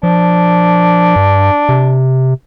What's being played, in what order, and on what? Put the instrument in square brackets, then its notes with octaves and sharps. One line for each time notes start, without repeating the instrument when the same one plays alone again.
[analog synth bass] F3 [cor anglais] D4
[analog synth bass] G2
C3